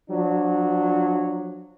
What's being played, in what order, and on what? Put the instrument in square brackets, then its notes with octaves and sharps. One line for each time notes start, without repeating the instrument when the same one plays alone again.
[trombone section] F3 F#3 D4